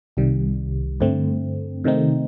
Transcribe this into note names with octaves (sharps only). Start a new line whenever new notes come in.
C2 C3 D#3 G3
G2 D3 A3 C4
C3 D#3 A3 C4 D#4